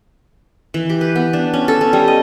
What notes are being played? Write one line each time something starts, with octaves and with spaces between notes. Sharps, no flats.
E3
G4
B4
B3
D4
C#4
A4
C#4
G3
D#5